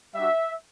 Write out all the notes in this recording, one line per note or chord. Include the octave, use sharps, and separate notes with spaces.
G3 D4 F#4 E5